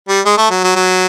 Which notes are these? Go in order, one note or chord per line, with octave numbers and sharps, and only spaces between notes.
G3
G#3
A3
F#3
F#3
F#3